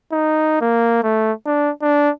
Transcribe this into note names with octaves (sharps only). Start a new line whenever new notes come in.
D#4
A#3
A3
D4
D4